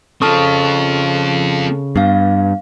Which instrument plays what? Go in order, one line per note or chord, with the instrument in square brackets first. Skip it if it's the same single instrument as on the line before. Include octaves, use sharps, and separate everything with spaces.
[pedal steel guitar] C#3 C#6 D#6 [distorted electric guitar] C4 F4 [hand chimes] A4 A5 F6
[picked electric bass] G2 [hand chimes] B3 F5